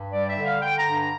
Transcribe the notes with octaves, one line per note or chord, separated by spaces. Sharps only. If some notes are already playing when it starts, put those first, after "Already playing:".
Already playing: G2
G3 D5
E5
D3
F5
D3 G5
A#5
G2
A#5